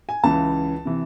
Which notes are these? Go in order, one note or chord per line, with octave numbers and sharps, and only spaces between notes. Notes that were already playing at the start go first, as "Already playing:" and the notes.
G#5
C#2 C#3 E3 A5
C3 E3